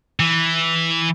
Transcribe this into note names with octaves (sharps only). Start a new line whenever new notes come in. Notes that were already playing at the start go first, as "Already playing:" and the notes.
E3